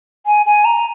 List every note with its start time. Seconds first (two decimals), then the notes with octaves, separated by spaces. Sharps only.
0.26 G#5
0.46 G#5
0.65 A#5